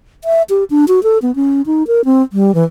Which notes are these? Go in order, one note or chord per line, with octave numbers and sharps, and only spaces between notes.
E5
G4
D4
F#4
A4
B3
C#4
D#4
A#4
C4
G3
E3